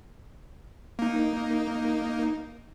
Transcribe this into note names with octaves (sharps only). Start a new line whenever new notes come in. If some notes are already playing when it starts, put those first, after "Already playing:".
A#3 D#4